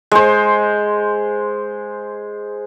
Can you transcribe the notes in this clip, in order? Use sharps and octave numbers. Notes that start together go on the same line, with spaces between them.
G#3 C5